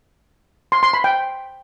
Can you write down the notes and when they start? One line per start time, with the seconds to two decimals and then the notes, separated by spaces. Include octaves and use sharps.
0.72 C6
0.83 C6
0.93 B5
1.04 G5